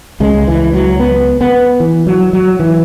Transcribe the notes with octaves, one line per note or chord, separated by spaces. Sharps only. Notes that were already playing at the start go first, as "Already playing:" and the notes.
C#2 C#3 G#3
E3
F#3
B3
B3
E3
F#3
F#3
E3